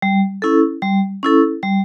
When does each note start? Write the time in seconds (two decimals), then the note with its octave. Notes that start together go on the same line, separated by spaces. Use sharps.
0.02 G3
0.42 C#4 E4 A4
0.82 G3
1.23 C#4 E4 A4
1.63 G3